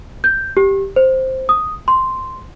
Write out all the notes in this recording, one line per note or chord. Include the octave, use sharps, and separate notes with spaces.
G6
G4
C5
D#6
C6